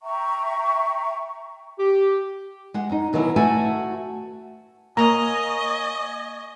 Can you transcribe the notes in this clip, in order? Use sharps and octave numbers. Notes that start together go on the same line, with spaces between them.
E5 G5 A#5 C#6
G4
G#3 F#5
F#2 C#4 D#4
B2 D#3 E3 F#3 B3 A#4
A3 F#4 E5 G#5 A5
A#3 C#5 D#5 G#5 A#5